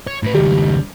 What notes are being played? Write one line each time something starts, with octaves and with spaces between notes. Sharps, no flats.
C#5
A2 B4
C#2 D#3 G3